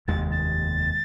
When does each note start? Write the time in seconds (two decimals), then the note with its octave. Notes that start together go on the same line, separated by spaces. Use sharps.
0.07 F1 D#2 D#3 G#3 A6
0.32 A6